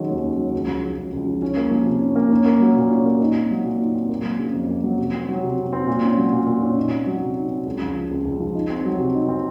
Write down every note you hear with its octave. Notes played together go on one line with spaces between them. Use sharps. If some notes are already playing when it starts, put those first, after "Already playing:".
Already playing: D#3 F#3 G#3 C#4
D#2
C#4
F#3
C#2
F3
C#3
C#2
C#2
F3
C#4
A#3
F3
C3
C#4
A#3
C#4
A#3
F#3
A#2
C#4
A#3
D#4
C4
F#3
A#2
D#4
C4
A#3
F#3
C#3
F2
A#3
F#3
C3
C4
F#3
C3
C3
C4
A#2
C#4
F#3
A#2
A#2
C#4
D#4
C4
F#3
C3
D#4
C4
C#2
F3
C#3
C#2
C#2
F3
D#4
C4
F#3
C3
D#4
C4